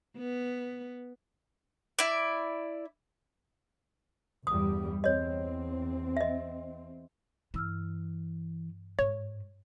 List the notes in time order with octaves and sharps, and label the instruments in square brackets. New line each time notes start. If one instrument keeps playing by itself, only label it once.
[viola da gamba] B3
[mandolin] E4 D5
[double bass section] G1 E2 G3 [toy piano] D#6
[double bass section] E2 C4 [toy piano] C#5 D#5
[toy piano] D#5 E5
[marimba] G2 E6 F6 [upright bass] E3
[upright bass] G#2 [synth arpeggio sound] C#5